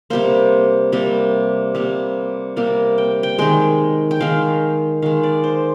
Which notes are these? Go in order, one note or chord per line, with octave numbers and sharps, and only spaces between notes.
C3 G3 A#3 C5
C3 G3 A#3
C3 G3 A#3
C3 G3 A#3 A#4
G5
G5
D#3 G#3 G5
G5
D#3 G#3 F5
D#3 G#3 F5
D5
C5